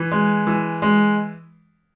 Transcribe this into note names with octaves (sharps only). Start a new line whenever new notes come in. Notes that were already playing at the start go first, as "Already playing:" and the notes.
Already playing: E3
G#3
E3
G#3